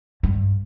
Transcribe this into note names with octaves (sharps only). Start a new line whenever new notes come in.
G2